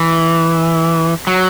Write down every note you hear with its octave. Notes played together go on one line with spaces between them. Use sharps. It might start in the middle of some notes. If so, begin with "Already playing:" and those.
Already playing: E3
F#3